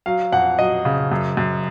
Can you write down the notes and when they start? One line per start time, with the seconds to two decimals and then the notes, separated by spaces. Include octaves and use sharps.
0.06 F#3 F5
0.32 F2 F#5
0.59 F#3 D#5
0.85 C#3
1.12 F#2
1.37 F#2